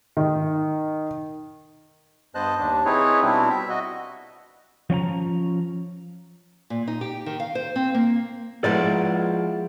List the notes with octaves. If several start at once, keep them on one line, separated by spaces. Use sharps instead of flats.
D#3
G2 B3 C5 D#5 A5 F#6
D#2 D4
C4 D#4 E4 G#4 B4 C#5
B2 G3 B3 C4 D4 E4
E5
F#4 D#5
F3 C#4 F#5 A#5
A#2
D#4
G4
D#3
F5
C5
C4
A#3
F3 G#3 B3 E4 D5